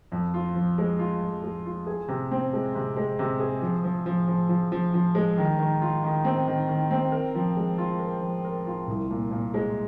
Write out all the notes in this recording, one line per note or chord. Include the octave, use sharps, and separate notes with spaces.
F2
F4
F3
G#3
F4
F2
G#3
F4
G#4
C3
C4
G#3
C3
G#3
C3
G#4
F3
F3
F3
F3
F3
F3
F3
G#3
D#3
D#3
F4
D#3
C4
D#3
D#3
C4
A#4
F3
G#3
F4
A#4
F3
A#4
F4
C2
A#2
A#2
G#3